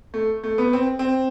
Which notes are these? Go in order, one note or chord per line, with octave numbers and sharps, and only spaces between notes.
A3
A3
B3
C4
C4